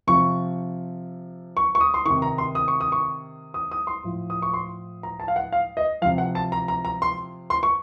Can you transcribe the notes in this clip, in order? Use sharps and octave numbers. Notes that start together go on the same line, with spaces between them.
C3 F3 C#6
C#6
C#6
D#6
C6
C3 D#3 C#6
A#5
C6
D#6
C#6
D#6
C#6
D#6
D#6
C6
A2 F3
D#6
C#6
C6
A#5
A5
F5
F#5
F5
D#5
C3 F3 F5
F#5
A5
A#5
A#5
A#5
C6
C6
C#6